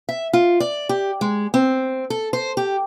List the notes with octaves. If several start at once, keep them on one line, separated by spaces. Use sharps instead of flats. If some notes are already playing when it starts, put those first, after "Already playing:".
E5
F4
D5
G4
G#3
C4
A4
C5
G4